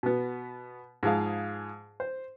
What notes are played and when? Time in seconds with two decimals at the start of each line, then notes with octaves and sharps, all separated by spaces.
0.03 B2 B3
1.03 G#2 F3 G#4 F5
2.00 C5